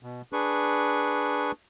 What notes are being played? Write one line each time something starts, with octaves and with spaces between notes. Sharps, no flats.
B2
D4 G#4 B4 C#6